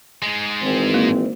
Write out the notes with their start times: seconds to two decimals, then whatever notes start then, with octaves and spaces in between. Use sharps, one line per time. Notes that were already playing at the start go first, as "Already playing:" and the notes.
0.22 G#2 G#3
0.62 G#1 E3 C4
0.94 A#3 F#4